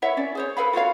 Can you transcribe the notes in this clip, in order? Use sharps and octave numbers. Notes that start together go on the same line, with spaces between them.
E4 C#5 E5 F#5
C#4 D5
G#4 C5 C#5
A4 B4 F5 B5
F4 F#4 C#5 F5